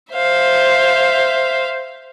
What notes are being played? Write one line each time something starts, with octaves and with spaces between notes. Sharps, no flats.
C5 E5 F5